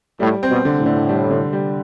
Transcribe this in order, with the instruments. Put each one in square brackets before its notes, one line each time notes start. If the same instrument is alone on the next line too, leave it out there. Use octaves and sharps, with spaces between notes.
[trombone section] A2 [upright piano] G3
[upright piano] C4
[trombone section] B2
[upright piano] D3
[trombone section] A2
[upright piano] D3
G3
D3
G3